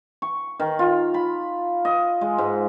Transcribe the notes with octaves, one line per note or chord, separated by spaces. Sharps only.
C#6
D#3
F4
B5
D#5
G#3
G#2